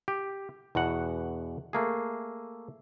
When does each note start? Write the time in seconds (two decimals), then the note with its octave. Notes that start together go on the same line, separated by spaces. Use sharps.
0.08 G4
0.75 E2 B2 F#4 F#5
1.73 A3 A#3 G#4